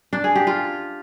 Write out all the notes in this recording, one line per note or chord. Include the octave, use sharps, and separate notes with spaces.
D4
G#4
G4
F4